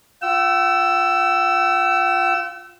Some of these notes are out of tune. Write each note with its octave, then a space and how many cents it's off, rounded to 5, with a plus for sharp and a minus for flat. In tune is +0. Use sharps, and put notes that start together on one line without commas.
F4 +0 G5 -45 E6 +10